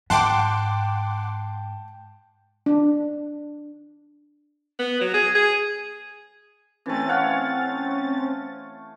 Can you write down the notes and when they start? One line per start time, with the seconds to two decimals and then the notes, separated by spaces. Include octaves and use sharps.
0.10 G#2 F#5 G5 A5 C6 D6
2.66 D4
4.79 B3
5.01 F#3
5.13 G#4
5.35 G#4
6.86 E3 A3 C4 C#4 A6
7.09 C#5 F5 F#5